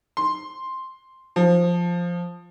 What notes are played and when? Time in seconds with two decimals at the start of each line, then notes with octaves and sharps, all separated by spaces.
0.17 C6
1.36 F3